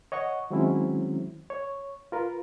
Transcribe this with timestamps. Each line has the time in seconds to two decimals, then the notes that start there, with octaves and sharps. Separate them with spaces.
0.12 C#5 D#5 F#5 C#6
0.50 D#3 F#3 G#3 C4 C#4 E4
1.50 C#5
2.12 F4 A#4 B4